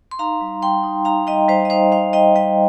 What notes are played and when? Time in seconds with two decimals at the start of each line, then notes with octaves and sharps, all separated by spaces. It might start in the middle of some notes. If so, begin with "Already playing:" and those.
0.11 C6
0.19 D#4 F5 A#5
0.41 G3
0.62 G3 G5 C6
0.83 D#4
1.05 D#4 F5 A#5
1.27 G3 D#5 G5
1.48 G3 C5 F5
1.65 D#5
1.70 D#4 C5 F5
1.92 D#4 C5 F5
2.13 G3 D#5 G5
2.35 G3 D#5 G5